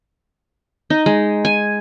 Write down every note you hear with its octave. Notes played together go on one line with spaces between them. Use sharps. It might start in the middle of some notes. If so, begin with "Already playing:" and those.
D#4
G#3
G#5